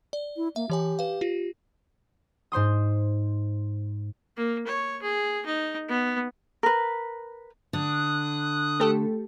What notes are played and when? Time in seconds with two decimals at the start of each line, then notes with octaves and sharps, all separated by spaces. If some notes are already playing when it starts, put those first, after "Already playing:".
0.13 D5
0.37 E4
0.56 A#3 E5
0.70 E3 G4 C#5 G#5
0.99 B4 F5
1.21 F4 G4
2.52 G#2 C5 C6 D#6
4.37 A#3
4.67 C#5
5.02 G#4
5.46 D#4
5.88 B3
6.63 A#4 B4
7.73 D3 D#6 F#6
8.80 A3 G4 A4